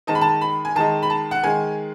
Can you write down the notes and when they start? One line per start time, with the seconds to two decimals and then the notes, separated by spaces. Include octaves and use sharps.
0.07 D#3 G#3 D#4 A5
0.15 B5
0.21 A5
0.41 B5
0.65 G#5
0.75 D#3 G#3 D#4 A5
1.03 B5
1.10 A5
1.31 F#5
1.43 D#3 G#3 G#5